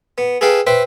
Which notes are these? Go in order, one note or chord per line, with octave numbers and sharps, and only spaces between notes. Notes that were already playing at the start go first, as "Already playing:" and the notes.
B3
G#4 A4 B4 F5 G5
B4 C5 E5 G5